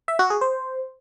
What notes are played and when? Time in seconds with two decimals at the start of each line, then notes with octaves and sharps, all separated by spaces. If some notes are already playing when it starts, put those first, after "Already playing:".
0.08 E5
0.19 F#4
0.30 G#4
0.41 C5